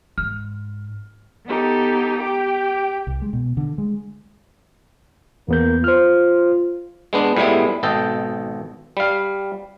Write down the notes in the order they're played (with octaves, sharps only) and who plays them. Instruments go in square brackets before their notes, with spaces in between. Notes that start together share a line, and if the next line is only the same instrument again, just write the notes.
[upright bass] G#2 [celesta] F6
[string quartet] B3 D#4 G4 A4
G4 G5 D6
[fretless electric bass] C2
G#3
B2
D3
G#3
[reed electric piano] E2 B3 G6 [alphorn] A#3
[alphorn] F4 [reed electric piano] C5 F6
[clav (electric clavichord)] G#3 B3 D4
A2 G3 G#3 B3 E4
G#1 B2 A4 D#5 G5
G3 F5